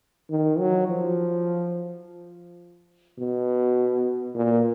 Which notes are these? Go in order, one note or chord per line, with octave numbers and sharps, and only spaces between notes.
D#3
F#3
F3
B2
A#2